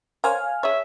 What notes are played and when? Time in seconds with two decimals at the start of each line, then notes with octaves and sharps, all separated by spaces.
0.24 A#4 C5 C#5 F5 G#5 F6
0.63 G#4 C#5 E5